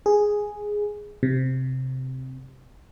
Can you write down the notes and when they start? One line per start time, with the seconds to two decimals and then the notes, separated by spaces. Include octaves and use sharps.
0.06 G#4
1.23 C3